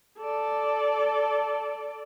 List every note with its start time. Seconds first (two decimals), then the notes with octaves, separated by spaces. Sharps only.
0.18 A4 D5